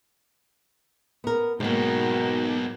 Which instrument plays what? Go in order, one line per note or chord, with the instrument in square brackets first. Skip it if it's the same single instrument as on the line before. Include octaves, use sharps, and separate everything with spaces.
[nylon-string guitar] B3 A#4
[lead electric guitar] B1 B2 [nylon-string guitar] G#2 A#3 [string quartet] F#4 A#4 G5